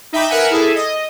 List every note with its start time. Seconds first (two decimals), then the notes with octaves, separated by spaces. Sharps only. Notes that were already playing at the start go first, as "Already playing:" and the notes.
0.13 D#4 E5 G5 B5 D6
0.30 A#4 B4 E5 F#5 G#5
0.51 E4 G#4 A4
0.76 D#5